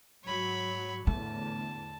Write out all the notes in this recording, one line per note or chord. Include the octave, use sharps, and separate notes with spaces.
G#2 F#3 C#5 B5
E2 A2 D3 A3 A5